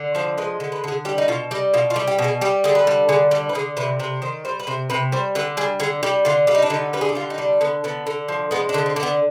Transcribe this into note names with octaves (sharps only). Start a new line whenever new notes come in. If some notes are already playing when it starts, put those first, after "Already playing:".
Already playing: D3
F3 C5
G#3 B4
D3
B4
D3 G#4
G3 G4
D#4
B2 F4
G3 D#4
B2 F4
F4
G3
G4
B2
G#4
G3 G4
D3 G#4
B4
G3
D3 G#4
G3
B4
D3 G#4
C3 B4
C3 B4
D#3 C5
G3 C5
B4
C3 C5
C3 B4
G3 C5
D3 B4
G3 G#4
D3 G#4
G3 G4
D3 F4
G3 F4
D#4
D4
D3 D#4
G3 B4
G#4
G4
D3 F4
D#4
G3 D4
D3 B3
D3 B3
D3
F3
G#3 B3
D4
D3
C4
D3
B3